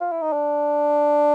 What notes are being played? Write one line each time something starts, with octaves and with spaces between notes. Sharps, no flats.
F4
E4
D#4
D4